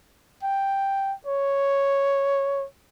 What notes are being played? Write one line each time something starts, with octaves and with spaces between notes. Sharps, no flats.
G5
C#5